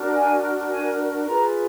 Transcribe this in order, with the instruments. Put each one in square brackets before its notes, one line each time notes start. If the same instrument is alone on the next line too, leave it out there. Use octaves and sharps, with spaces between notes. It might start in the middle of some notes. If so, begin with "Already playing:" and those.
Already playing: [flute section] D4 F#4 A#4
G#5
G#5
F4 G#4 B4 A#5